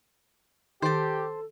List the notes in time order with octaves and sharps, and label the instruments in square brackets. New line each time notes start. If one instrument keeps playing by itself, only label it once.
[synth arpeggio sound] D#3 [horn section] G4 [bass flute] A4 [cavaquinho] C5 A5